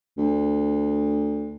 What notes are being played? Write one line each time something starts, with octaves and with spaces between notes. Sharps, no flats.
D2